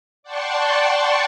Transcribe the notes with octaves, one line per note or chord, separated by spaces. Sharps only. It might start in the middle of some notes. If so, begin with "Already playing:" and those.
D5 F#5 G5 A5 C6 C#6